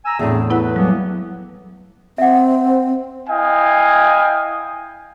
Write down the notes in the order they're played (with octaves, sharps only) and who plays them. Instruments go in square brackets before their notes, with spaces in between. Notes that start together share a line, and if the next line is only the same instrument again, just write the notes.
[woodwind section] G#5 A#5 E6
[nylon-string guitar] E2 A2 [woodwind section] C4 D4 G#4
[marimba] B3 E4 F#5 [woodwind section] B4
[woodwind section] E3 A#3 B3 [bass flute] F#3 [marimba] G3
[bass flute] C4 [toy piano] E5 F#5
[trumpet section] E4 D#5 F5 G5 G#5